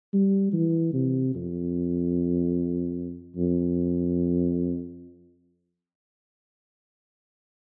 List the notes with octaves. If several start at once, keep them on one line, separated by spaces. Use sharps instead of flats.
G3
E3
C3
F2
F2